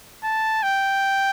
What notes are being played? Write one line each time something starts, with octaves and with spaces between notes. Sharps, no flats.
A5
G5